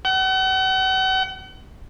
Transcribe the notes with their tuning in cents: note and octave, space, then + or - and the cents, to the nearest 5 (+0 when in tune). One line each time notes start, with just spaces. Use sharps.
F#5 +40